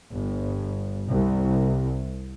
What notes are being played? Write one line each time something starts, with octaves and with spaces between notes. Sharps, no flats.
G1
C2